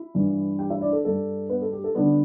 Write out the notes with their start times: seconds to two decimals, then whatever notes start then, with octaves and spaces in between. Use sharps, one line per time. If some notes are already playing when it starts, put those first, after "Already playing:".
Already playing: E4
0.14 G2 E3 G3
0.59 G4 G5
0.70 E4 E5
0.81 D4 D5
0.93 A4
1.05 G2 G3 D4 A4
1.49 B3 B4
1.62 A4
1.72 G4
1.84 A4
1.95 D3 G3 B3 D4 B4